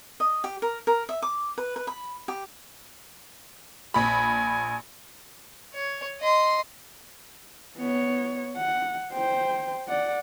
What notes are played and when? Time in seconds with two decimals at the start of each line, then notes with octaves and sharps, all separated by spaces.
0.20 D#5
0.44 G4
0.62 A#4
0.87 A#4
1.09 E5
1.22 D6
1.58 B4
1.76 B4
1.87 B5
2.28 G4
3.94 A#1 G#5 B5
5.74 C#5
6.20 D#5 C6
7.77 B3 C#5
8.57 F#5
9.13 C5 G5
9.88 D5 F#5